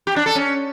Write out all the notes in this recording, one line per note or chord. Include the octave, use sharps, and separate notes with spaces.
G4
D4
A4
C#4